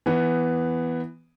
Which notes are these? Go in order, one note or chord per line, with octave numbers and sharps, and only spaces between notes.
E3 B3